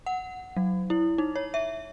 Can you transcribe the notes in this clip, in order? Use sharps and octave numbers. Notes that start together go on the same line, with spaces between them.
F#5
F#3
E4
D#4
C#5
E5